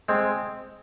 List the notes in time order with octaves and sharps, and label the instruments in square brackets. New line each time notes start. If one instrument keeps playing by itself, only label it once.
[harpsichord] G#3 C4